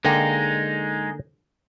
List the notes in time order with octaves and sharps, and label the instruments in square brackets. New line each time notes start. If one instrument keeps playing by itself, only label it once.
[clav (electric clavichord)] D3 A#3 G5 [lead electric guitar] G#3 D#4